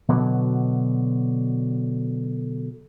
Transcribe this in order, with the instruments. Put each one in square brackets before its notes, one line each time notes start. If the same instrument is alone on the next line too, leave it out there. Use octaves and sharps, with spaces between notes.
[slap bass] B2 D3 F#3